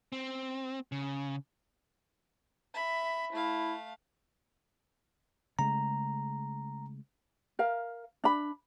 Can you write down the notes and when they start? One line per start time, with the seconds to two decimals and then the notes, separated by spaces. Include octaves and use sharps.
0.12 C4
0.92 C#3
2.74 E5 B5
3.32 A3 E4 F5
5.59 C#3 G#3 A3 A#5
7.59 A#4 F5
8.24 D4 B5